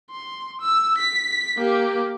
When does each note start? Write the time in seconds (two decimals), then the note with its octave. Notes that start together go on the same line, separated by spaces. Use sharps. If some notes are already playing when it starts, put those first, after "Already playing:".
0.10 C6
0.61 E6
0.98 B6
1.57 A#3 G4